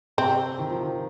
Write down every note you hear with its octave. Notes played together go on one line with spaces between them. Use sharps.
C3 C4
D#3
F3
D#3